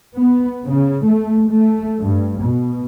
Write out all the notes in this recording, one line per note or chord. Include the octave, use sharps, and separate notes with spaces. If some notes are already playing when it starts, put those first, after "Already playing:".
B3
C#3
A3
A3
G2
B2